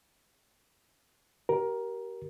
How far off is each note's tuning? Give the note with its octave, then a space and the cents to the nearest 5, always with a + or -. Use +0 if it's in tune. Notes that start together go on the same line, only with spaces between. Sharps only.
G4 -30 A#4 +15